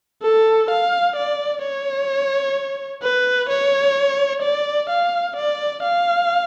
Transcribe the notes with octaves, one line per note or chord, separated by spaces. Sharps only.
A4
F5
D5
C#5
B4
C#5
D5
F5
D5
F5